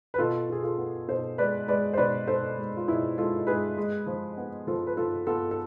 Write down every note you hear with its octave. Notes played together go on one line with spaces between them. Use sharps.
B4
B2 F4 A4
B2 G#4
F4 A4
B3
B2 A4 C5
G#3 B4 D5
G#3 B4 D5
C5
B2 B4 D5
B2 A4 C5
G#3
F4
B2 E4 G#4
G#3 F4 A4
G#3 G#4 B4
G#3
F3
B3
F3 F4 A4
B4
F3 F4 A4
B3 F4 A4
A4